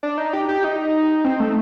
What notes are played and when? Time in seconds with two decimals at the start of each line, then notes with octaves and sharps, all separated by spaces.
0.03 D4
0.18 D#4
0.33 G4
0.48 G4
0.64 D#4
1.25 C4
1.40 A3